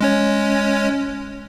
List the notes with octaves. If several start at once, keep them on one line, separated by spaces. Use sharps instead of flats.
G#3 C#4 C#5